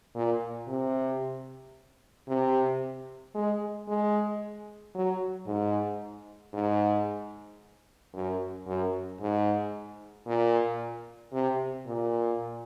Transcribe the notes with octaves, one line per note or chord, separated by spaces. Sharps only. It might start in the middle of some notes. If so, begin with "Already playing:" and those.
A#2
C3
C3
G#3
G#3
F#3
G#2
G#2
F#2
F#2
G#2
A#2
C3
A#2